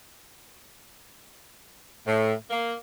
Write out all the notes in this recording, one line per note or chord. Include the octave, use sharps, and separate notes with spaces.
A2
A#3